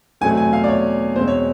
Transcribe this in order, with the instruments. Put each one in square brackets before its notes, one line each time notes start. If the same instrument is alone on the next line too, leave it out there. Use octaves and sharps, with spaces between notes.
[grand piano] E2 B2 F#3 A3 C4 G#5
G#5
F5
D5
C#5
E2 B2 G#3 C4 C5
C#5